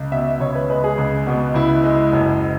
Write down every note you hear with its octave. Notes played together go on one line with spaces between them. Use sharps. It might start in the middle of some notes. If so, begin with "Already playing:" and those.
Already playing: C#2
B2 E5
C#2 C#5
B4
G#3 B4
G#4
C#2
B2
C#2 E4
G#3
F#1